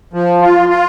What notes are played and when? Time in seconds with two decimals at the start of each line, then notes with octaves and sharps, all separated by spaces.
0.13 F3
0.41 F4
0.69 F4